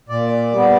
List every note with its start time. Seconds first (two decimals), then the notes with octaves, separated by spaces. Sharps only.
0.09 A#2 D5
0.52 G3 B3